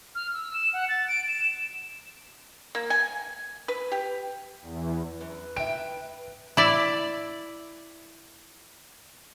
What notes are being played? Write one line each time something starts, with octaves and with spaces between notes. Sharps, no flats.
F6
E6
E7
F#5
A6
D7
E7
A#3
G#5
B4
G4
E2
F#2 B4
E5 G5 D7
E4 D5